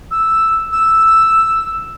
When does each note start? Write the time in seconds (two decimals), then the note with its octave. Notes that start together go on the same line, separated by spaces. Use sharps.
0.11 E6
0.72 E6